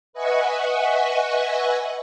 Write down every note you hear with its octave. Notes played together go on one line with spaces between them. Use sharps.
B4 D#5 E5 F#5 G#5 C#6